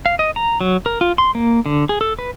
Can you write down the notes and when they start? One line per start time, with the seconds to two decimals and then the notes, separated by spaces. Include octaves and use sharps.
0.06 F5
0.19 D#5
0.36 A#5
0.61 F#3
0.86 A#4
1.01 F4
1.18 C6
1.35 A#3
1.66 D3
1.89 G#4
2.01 A4
2.19 B4